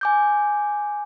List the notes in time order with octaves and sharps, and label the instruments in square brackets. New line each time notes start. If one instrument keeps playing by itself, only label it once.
[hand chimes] G#5 D6 G6